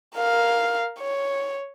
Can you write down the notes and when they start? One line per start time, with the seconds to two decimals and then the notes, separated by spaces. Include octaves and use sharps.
0.16 A#4 F5
1.00 C#5